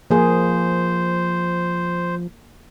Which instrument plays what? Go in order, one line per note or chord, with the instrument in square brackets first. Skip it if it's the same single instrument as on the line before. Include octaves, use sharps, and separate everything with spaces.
[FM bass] F3 [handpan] A#3 G#4 [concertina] C5